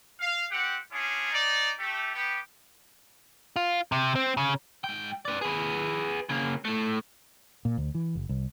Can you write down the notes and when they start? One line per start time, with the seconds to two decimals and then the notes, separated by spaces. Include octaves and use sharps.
0.20 F5
0.51 C4 G4 F#5
0.91 C#4 D4 F4 G#4
1.32 D#4 D5
1.79 A3 G4
2.14 B3 G4
3.56 F4
3.92 C3
4.15 C4
4.37 C#3
4.84 G#2 G5
5.25 B4 D5
5.41 G#4 B4
6.29 C#3 A#3
6.65 A2 A3
7.65 A#2
7.77 D2
7.95 E3
8.15 F#1
8.29 C2